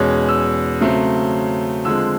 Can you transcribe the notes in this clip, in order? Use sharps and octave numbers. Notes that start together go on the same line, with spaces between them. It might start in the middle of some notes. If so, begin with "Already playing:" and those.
Already playing: E2 B2 G#3 C#4
E6
C#3 F#3 A3 C4
D3 F3 G#3 C4 E6